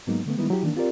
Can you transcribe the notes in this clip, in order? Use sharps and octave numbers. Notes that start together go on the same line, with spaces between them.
G#2 F#3 G#3 A#3 B3 D#4
D3 A3 B3
D#3 G3 G#3 B3 D#4 E4
F#3 E4 G4
D#3 E3 A#3 D4
C4 F4 G4 A#4 D5